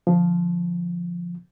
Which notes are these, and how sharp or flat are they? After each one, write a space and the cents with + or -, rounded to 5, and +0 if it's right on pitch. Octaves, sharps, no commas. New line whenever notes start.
D3 +5 F3 +0